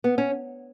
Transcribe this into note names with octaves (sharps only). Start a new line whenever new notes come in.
B3
C#4